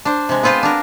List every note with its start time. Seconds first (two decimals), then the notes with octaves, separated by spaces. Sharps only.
0.05 D4 C5
0.29 C3 G#3
0.43 B3 C4 F4 B4 C5
0.63 D4 A#4